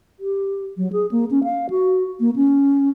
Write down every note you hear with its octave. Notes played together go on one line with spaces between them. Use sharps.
G4
F#3
G#4
A#3
C#4
F5
F#4
A#3
C#4